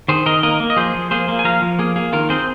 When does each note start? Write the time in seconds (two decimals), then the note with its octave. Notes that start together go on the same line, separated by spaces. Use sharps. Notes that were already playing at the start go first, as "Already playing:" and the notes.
0.08 D#3 G#4 C5
0.26 D#3 A#4 D#5
0.43 A#3 A#4 D#5
0.60 A#3
0.70 D#5
0.76 F3 G#4 C5
0.94 F3
1.11 A#3 G#4 C5
1.28 A#3
1.39 G#5
1.44 F3 F5 A#5
1.62 F3
1.79 A#3 G#4
1.96 A#3 G#4
2.13 D#3 F4 A#4
2.29 C4 G#4 C5